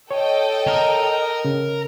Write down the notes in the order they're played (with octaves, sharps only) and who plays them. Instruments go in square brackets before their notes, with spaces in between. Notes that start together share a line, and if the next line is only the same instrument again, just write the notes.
[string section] A4 D#5 G5 [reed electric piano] C#5
[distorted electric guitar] A#4
[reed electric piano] C#3